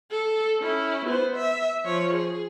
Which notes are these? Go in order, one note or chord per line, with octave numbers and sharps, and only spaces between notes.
A4
C#4 E4
B3 C5
E5
F3 C#5
G#4